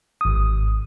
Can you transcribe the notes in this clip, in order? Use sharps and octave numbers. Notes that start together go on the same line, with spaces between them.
G#1 D#6